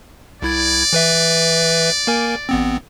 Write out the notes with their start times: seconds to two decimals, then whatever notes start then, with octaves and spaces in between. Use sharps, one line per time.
0.42 C2 E4 D5 G#6
0.93 E3 B4 E5
2.07 A#3 A#4 G#5
2.49 A1 B3 C4